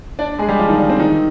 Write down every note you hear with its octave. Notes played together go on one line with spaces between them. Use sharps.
D4 D5
G#3 G#4
G3 G4
F3 F4
D#3 D#4
D4
C4
D#3 D#4